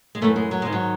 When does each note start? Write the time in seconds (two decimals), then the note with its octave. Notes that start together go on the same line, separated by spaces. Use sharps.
0.15 G#3
0.22 F#2 E3 A3
0.36 G#3
0.51 F#3
0.62 G#2 D#3 G#3
0.72 F#3